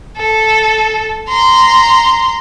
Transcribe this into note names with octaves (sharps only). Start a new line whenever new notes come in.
A4
A#5 C6